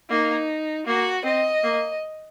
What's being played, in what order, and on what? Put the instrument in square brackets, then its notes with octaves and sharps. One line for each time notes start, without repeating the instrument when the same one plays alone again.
[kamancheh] A#3 [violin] D#4
[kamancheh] A#3 [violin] F#4
[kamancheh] C4 [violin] D#5
[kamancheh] A#3